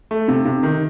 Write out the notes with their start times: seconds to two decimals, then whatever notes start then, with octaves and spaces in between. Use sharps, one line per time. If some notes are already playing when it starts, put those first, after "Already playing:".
0.11 A3
0.28 C3
0.45 C3
0.63 D#3